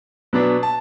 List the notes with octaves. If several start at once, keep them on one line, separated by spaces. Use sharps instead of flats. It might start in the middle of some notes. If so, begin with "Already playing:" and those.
B2 F#3 B3 D4
A5